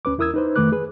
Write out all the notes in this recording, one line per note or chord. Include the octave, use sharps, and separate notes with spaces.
D2 C#4 B4 D6
E2 E4 A#4 D#6 E6 G#6
D#4 B4 C5
F2 D#3 A3 B4 D6 F#6
G#4 B4